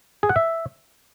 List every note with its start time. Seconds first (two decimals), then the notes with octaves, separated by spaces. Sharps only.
0.23 G#4
0.29 F#5
0.36 E5